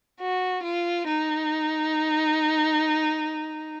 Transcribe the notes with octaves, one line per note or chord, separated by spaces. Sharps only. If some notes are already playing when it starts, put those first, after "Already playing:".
F#4
F4
D#4